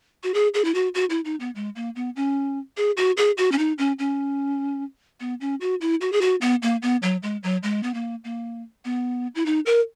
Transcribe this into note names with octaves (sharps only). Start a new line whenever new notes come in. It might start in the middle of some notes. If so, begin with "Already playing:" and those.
F#4
G#4
G#4
E4
F#4
F#4
E4
D#4
B3
G#3
A#3
B3
C#4
G#4
F#4
G#4
F#4
C#4
D#4
C#4
C#4
B3
C#4
F#4
E4
F#4
G#4
F#4
B3
A#3
B3
F#3
G#3
F#3
G#3
B3
A#3
A#3
B3
E4
D#4
A#4